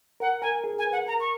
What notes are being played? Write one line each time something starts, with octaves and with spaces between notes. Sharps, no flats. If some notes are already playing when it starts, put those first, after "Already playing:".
A#4 F#5
A#4 G#5
G#4
G#5
B4
F#5
A#4 A#5
C#6